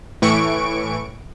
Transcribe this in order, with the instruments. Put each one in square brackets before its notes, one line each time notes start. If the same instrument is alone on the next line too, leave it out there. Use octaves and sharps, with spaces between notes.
[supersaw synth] A2 E3 C#6 D7